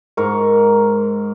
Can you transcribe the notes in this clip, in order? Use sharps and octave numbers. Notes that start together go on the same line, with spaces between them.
G#2 A#4 C#6